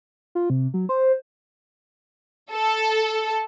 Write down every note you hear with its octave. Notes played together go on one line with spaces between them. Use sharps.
F4
C3
F#3
C5
A4